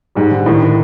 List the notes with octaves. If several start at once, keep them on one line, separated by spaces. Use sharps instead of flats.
G#2 G3
D3
A2 D#3
D#3